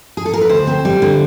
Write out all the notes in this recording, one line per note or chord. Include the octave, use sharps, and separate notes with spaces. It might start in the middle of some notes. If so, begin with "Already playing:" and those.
G#4
A4
A#4
B4
D2 C5
C4
G3
D3